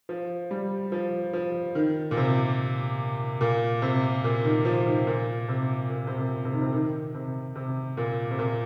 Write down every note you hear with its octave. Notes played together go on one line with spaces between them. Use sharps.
F3
G3
F3
F3
D#3
A#2
C3
A#2
C3
A#2
D#3
F3
D#3
A#2
C3
A#2
C3
A#2
C3
D#3
C3
D#3
C3
C3
A#2
C3
A#2